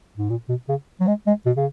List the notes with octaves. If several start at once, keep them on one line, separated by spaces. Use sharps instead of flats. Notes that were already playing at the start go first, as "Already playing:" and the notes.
G#2
A#2
B2
C#3
F#3
G#3
G#3
B2
C#3